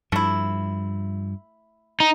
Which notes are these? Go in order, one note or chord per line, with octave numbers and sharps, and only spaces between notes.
G2 F3 A3 E4
D#4